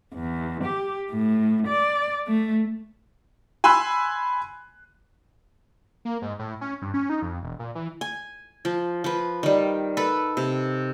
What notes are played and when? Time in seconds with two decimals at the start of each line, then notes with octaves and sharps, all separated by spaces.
0.14 E2
0.62 G4
1.10 A2
1.66 D5
2.27 A3
3.64 G#5 B5 C6 E6 F#6
6.05 A#3
6.22 G#2
6.39 A2
6.61 C#4
6.82 G2
6.94 C#4
7.10 D#4
7.22 F2
7.43 E1
7.59 A#2
7.75 E3
8.01 G#5
8.65 F3
9.04 F3 B4
9.43 D#3 G3
9.97 A4 B4
10.37 C3